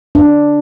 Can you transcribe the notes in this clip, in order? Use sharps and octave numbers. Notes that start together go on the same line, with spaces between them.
D4